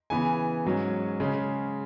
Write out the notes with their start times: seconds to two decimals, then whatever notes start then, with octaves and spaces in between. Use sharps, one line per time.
0.10 C#3 E3 B3 G#5
0.65 G#2 F#3 C#4
1.20 C#3 G#3 C#4